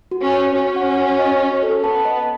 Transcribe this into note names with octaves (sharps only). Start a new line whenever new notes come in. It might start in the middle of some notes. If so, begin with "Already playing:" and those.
F#4
C#4
C#5
C#4 F#4
F#5
F#4
D#5
F#4
A4
B3 A5
D#5